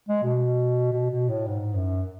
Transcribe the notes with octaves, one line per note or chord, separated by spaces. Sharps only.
G#3
B2
B2
B2
A2
G#2
F#2